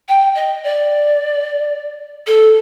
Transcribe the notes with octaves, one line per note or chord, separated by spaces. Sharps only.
G5
D#5
D5
A4